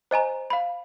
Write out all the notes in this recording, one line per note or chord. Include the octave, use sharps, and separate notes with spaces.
C5 D#5 G#5 A#5
F5 B5